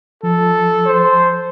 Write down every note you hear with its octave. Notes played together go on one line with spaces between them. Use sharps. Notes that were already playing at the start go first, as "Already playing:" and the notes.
F3 A4
C5